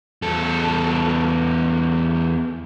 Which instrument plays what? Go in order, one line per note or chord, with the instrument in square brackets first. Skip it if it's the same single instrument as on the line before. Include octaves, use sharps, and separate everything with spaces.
[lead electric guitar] E2 A4